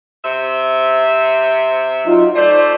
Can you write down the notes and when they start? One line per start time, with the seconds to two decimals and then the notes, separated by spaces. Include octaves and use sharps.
0.24 C3 E5
2.05 F#3 D#4 F4
2.36 A3 C5 D5